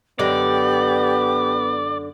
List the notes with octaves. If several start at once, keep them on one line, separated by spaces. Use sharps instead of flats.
F#2 D3 B3 G4 D5 D#5